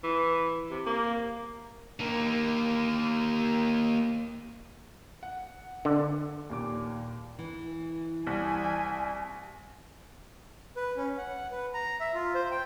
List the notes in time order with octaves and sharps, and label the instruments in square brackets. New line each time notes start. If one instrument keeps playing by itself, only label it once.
[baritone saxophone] E3
C3
A#3
[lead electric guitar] D#3 A#3
[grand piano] F#5
[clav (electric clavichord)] D3
[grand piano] D#2 A#2 D6
[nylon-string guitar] E3
[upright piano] C2 [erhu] G#5
[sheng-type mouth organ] B4
C#4
F#5
B4
A#5
E5
F4
C5
G5